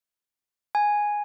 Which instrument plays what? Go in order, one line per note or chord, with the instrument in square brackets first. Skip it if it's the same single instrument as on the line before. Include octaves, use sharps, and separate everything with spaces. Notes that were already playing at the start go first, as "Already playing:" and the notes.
[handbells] G#5